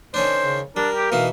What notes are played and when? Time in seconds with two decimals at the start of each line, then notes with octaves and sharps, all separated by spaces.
0.14 D#3 C#4 D4 C5
0.41 C#3
0.77 G3 D4 A#4
0.96 G4
1.12 B2 E3 D#4 F5